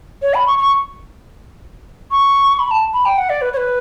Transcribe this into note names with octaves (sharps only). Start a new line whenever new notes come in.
C#5
B5
C#6
C#6
C#6
B5
A5
B5
G5
F#5
D5
B4
C#5
B4